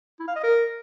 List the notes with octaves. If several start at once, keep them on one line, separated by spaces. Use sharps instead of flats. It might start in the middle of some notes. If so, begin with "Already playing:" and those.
E4
F5
D#5
A#4